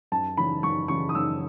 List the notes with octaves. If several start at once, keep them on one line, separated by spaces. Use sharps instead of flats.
F#2 A5
C#3 E3 B5
F#2 C#6
C#3 E3 C#6
D#6
F#2 E6